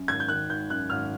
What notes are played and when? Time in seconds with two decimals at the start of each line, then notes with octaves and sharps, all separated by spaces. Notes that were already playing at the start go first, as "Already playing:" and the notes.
Already playing: F#2
0.08 G#1 G#6
0.20 G6
0.28 D#3 F#6
0.49 G#1 G6
0.70 F#2 F#6
0.90 G#1 F6